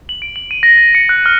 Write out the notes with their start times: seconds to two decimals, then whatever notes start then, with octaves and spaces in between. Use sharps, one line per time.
0.09 F#7
0.22 D7
0.36 F#7
0.51 D#7
0.63 A#6
0.77 A6
0.95 C#7
1.09 F#6
1.26 F6